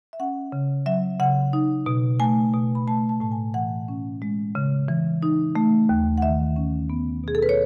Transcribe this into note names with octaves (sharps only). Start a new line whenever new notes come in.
E5
C#4 F#5
C#3
F#3 E5
C#3 F#5
D#4
B2
A3 G#5
B2
B5
A3 A5
A5
A2 A5
G#5
E3 F#5
C#4
G#3
C#3
E3
D#4
A3
D#2
F#5
D#3 E5
C#4
B3
B2 G#4
A4
B4
C#5